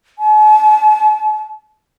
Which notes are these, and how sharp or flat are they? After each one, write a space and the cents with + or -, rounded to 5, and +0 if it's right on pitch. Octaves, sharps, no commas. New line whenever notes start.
A5 -45